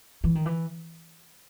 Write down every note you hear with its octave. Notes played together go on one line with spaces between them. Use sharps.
E3
D#3
E3